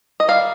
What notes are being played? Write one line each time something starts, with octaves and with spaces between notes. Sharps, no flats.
D#5
D#3 G3 F5